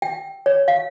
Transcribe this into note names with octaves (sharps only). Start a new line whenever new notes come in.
G5
C#5
F5